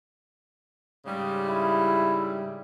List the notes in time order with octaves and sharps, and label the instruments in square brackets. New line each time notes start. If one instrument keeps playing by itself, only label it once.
[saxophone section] G#2 C#3 G3
[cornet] E4